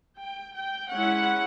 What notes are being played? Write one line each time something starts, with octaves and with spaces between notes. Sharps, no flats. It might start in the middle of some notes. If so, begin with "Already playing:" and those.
G5
G5
G#3 C#4 E4 F#5